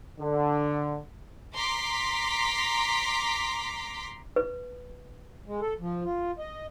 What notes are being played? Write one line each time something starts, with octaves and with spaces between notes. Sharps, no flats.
D3
A#5 C6 D6 B6
B4
G#3
A4
F3
F4
D#5